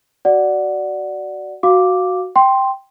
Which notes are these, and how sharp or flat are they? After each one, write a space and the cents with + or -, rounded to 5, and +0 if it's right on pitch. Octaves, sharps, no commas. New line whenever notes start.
F#4 +15 D5 +0 F#5 +0
F#4 +0 F5 +5 D6 +0
G5 +0 C6 +0